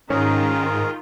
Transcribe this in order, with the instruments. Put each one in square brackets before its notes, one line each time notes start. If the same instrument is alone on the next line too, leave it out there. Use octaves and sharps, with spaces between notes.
[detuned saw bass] G#2 [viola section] D#3 F4 [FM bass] C#4 [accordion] G#4 A#4